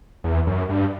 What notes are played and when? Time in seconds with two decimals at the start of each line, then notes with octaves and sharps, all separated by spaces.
0.24 E2
0.47 F#2
0.69 G2